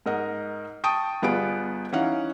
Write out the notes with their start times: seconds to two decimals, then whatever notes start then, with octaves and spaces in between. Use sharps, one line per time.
0.06 G#2 A#4 D#5 F#5
0.84 G5 A5 C#6 D#6 D7
1.22 G1 B3 F4 G#4 D7
1.92 E3 C#4 D#4 F5 F#5